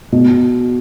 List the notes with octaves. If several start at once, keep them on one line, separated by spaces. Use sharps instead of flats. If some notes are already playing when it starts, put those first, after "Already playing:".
B2